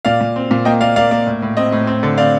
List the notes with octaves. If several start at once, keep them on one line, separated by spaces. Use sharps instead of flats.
A#2 D5 F5
A#2
C4
A#2
A#3 D#5 G5
A#3 D5 F5
A#3 D5 F5
A#3 D5
A2
A2
C4 D#5
A2
C4
D3
C4 D5 F5